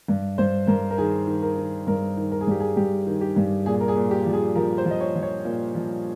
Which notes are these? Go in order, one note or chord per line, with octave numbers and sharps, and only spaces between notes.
G2
G2 C5
G2 A#4
A#4
D#3 G#4
D#3
A#4
D#3
G2 A#4
D#3
A#4
G#4
G2 G4
G#4
G2 G4
D#3
G4
G2
A#2 G#4
A#4
G#4
A#2
G4
F3
G#4
F3 A#4
C5
F3
D#5
C#5
F3
C#5
A#2
F3